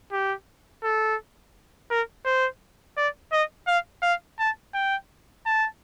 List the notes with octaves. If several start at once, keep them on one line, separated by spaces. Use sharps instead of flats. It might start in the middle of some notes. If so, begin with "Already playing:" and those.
G4
A4
A#4
C5
D5
D#5
F5
F5
A5
G5
A5